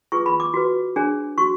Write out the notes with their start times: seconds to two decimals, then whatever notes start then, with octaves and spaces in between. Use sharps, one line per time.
0.12 F4 G#4 B4 C#6
0.26 B5
0.40 D6
0.54 F#4 B4
0.96 D4 G#4 C#5
1.38 F#4 C#6